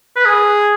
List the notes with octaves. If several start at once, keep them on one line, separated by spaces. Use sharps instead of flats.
B4
G#4